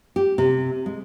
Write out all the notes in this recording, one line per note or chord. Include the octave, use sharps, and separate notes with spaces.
G4
C3
G#3